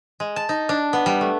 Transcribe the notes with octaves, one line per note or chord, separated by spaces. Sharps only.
G#3
A5
D#4
D4
B3
G3
A3